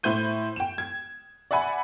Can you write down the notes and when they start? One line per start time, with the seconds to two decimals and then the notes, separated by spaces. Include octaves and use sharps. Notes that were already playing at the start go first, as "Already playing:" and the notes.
0.03 A2 E4 C5 G6 D#7
0.56 G5 E7
0.78 G#6
1.51 D5 E5 F#5 G#5 B5